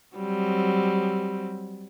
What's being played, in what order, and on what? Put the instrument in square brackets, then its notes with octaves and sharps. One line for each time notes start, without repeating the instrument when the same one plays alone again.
[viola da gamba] F#3 G3 C4